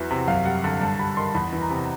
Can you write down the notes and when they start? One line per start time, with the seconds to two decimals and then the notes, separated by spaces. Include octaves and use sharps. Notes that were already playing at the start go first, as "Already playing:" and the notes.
Already playing: E2 E3 F#3 E5
0.11 C3
0.28 F#2 F5
0.45 G3 F#5
0.64 D3
0.81 G2 A5
0.99 G3 B5
1.17 D#3 C6
1.35 E2 B5
1.53 E3
1.61 A#5
1.70 C3